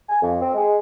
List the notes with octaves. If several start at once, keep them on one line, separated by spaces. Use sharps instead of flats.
G#5
F2
C4
G#3